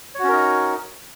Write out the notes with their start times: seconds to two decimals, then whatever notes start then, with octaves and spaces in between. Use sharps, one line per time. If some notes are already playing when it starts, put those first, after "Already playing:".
0.15 C#5
0.19 F#4
0.24 C#4
0.28 A#4
0.33 D#4